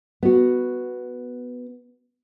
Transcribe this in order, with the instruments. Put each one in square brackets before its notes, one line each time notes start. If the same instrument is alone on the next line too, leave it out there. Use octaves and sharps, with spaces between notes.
[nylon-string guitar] B3 F#4